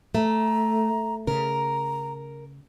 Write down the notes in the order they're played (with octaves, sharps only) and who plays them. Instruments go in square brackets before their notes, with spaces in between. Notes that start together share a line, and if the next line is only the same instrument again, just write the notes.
[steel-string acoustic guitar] A3 [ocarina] A#5
[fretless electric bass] C#3 [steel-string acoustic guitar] A#4 [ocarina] A#5